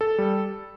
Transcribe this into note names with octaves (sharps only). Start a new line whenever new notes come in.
A4
G3